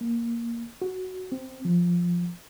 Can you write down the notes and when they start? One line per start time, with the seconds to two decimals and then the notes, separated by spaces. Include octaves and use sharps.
0.01 A#3
0.82 F#4
1.32 C4
1.65 F3